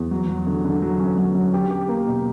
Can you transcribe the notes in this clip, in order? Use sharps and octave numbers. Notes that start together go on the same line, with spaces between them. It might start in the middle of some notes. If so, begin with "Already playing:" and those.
Already playing: E2
F#3
F#3
D3
D3
F#3
C#4
F#3
F#3
G4
G4
A#3
B2